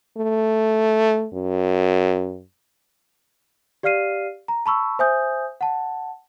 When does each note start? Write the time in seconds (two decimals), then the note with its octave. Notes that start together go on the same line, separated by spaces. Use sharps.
0.18 A3
1.34 F#2
3.83 G4 D5 F5 F6 C7 D#7
4.48 A#5
4.66 A5 B5 C#6 E6
4.99 C5 E5 G#5 D#6 G6
5.61 F#5 A5